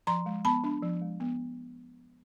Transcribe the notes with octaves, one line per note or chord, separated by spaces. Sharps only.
F3 A#5 C6
G#3
B3 A5 B5
D4
F3
G#3
B3